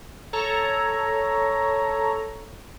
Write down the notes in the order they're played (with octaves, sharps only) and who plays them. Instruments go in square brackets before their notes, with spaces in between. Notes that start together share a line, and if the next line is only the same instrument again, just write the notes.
[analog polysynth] A4 C#5 A#5